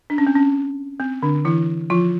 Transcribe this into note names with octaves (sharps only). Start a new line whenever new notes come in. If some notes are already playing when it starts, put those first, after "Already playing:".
D4
C#4
C4
C#4
C4
D3 D4
E3 E4
F3 F4